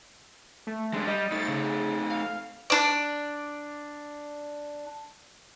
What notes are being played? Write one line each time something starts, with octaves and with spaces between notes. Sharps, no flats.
A3
G#3 D4
G3 D#5
A3 D#4 A6
C#3
F5
D4 D5